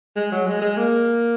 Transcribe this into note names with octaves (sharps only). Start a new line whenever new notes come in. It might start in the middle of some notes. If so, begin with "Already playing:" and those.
G#3
F#3
G#3
G#3
A#3